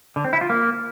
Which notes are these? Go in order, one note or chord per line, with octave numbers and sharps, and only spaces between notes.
D3
C4
E4
F4
A#3